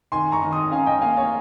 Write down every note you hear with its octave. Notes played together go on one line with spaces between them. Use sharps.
D#3 G#5 C6
A#5 C#6
D#3
C6 D#6
C#4 F5 G#5
D#5 G5
A#3 F5 G#5
C#5 F5